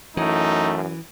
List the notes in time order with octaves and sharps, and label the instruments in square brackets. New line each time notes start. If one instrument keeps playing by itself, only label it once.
[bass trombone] F#2 [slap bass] E3 [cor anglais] A3 [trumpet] D#4